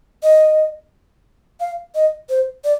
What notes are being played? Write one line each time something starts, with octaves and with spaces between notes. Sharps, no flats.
D#5
F5
D#5
C5
D5